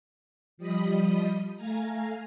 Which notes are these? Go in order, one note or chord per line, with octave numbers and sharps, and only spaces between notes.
F3 G3 D#5 B5 D#6
A3 F5 G#5 A#5